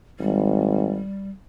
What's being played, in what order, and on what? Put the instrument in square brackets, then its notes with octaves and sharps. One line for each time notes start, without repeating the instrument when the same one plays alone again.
[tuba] G#1 [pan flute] G3